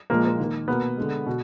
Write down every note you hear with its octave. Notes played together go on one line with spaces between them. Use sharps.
A#2 F3 G#3 A#3
A#3
D#3
A#3
B2 A#3 B3
D3 G#3
B2